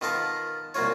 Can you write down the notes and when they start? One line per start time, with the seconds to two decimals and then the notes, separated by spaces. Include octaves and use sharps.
0.01 D#3 B3 F4 A4 A#4 A5
0.74 C2 F#3 A#3 F4 C#5